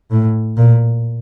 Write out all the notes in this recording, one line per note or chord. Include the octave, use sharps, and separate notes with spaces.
A2
A#2